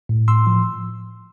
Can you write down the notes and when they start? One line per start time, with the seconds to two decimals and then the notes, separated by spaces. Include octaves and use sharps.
0.09 A2
0.28 A2 C6 E6
0.47 F3